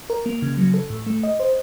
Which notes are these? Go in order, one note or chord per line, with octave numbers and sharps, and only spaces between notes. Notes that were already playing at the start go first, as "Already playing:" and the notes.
A#4
A#3
C#3
F#3
A4
A2
A3
D#5
C5